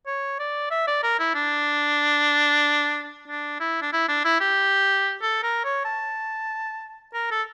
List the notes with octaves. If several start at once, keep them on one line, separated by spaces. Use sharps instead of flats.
C#5
D5
E5
D5
A#4
E4
D4
D4
E4
D4
E4
D4
E4
G4
A4
A#4
C#5
A5
A#4
A4